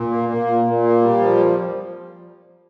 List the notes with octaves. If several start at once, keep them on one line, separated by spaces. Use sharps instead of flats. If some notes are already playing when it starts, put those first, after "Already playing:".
Already playing: A#2
A#3
A#3
A#2
A#2
A#3
G3
F3
F2